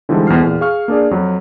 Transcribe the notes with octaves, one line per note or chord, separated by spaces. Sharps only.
D3 E3 F3 G3 G#3 D#4
E2 B2 F3 A4 F6 C7
E2 A#2
G#4 F5 C#6 F6
A#3 D4 G#4 D5
F2 F#3